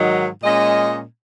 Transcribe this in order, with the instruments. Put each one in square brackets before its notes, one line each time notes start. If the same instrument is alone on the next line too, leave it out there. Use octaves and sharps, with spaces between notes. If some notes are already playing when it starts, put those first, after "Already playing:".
Already playing: [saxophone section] G#2 D#3 F#3 D#4
A#2 G#3 C#4 D#5